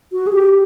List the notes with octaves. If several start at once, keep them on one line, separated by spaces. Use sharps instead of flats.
F#4
G#4
G4